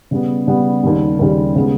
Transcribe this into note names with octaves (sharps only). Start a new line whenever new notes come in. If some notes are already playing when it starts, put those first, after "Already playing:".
C#3 G3 B3
C#3 G3 B3
D#2 C#3 G3
D#2 C#3 G3
C#3 G#3 B3